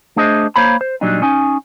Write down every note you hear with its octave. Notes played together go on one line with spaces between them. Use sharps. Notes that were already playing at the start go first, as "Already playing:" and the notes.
A3 D4 G#4 C5 D#5
A#3 C5 C#5 A#5 B5
C5
A#2 F#3 G3 D4 D#4
C#4 D#4 G#5